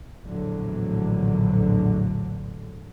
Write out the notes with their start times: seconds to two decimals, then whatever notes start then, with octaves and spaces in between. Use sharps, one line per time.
0.24 A#1 E2 A2 D3 F#3